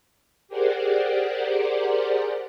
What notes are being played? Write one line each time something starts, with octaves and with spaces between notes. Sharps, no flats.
G4 G#4 A#4 C5 D5 F#5